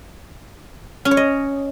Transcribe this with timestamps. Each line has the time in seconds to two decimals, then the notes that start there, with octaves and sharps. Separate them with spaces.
1.05 C#4
1.11 C#5
1.17 D#5